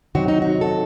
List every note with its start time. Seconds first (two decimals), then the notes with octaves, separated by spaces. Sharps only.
0.15 C3 D#3 F#3 F#4
0.28 D#4
0.42 F#4
0.61 A4